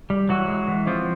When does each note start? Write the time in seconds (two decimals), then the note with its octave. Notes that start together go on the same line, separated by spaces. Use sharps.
0.10 G3
0.29 E3 F#3 F#4
0.48 G#3
0.68 E3
0.87 F3 C4 F4